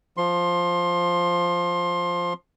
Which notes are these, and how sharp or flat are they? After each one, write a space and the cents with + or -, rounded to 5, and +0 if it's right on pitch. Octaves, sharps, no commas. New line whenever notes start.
F3 +0 C6 +20